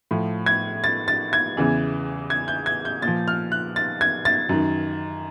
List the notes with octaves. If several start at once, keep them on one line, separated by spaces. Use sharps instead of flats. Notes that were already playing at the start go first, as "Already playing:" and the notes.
A2 F3
G#6
A6
A6
G#6
E2 C#3 E3
G#6
G6
G#6
G6
A#2 F3 A6
F6
F#6
A6
G#6
A6
F#2 D#3